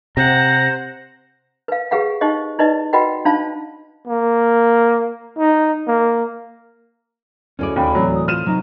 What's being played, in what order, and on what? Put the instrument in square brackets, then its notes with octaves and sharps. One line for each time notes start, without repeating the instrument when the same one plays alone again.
[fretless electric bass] C3 [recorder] C5 [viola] F#5 [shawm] A#5
[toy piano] B4 F5
G4 G#4 B4 F5 F#5
D#4 G4 C5 D#5
D#4 E4 B4 D5 D#5
F4 F#4 B4 D#5 F#5 G5
D4 D#4 F4 C5 F5 A5
[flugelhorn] A#3
D#4
A#3
[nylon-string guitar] D2 G#3 D5 [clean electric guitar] C#4 [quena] E4
[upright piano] D#2 [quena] B5
[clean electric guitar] A2 E3 C4 [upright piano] F#3
[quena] D#6
[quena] F4 [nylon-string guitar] C5 [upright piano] F6 D#7 E7
[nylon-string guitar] C3 [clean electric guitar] F#3 D#4 D#5 [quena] A#5